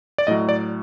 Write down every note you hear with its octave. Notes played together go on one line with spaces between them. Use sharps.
D5
A2 F#3 D#5
D5